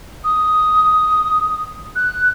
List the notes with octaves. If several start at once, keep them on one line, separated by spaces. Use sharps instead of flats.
D#6
F#6